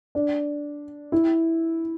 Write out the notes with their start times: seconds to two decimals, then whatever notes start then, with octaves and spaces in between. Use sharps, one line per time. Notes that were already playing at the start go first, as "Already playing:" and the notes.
0.15 D4
1.12 E4